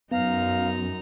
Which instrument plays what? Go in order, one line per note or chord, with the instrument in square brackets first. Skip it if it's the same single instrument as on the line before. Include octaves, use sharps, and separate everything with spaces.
[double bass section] F#2 [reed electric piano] B3 [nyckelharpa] D#4 A#5 [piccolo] F5